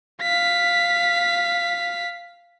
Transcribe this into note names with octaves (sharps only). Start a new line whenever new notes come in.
F5 B6